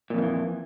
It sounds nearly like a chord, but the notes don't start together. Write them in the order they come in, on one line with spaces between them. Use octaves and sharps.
A#2 F2 D#3 E3